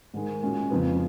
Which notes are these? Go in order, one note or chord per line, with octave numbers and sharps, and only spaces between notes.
G#2 D#3 G#3
A#2 G#3 C#4 F#4
F2 C#3 F3 B3